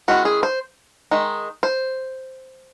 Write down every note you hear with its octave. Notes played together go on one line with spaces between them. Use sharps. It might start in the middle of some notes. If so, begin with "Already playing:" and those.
D#3 G#3 C#4 E4 F#4
G#4
C5
D#3 G#3 D#4
C5